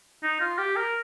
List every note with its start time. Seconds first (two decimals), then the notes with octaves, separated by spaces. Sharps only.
0.23 D#4
0.41 F4
0.58 G4
0.76 A#4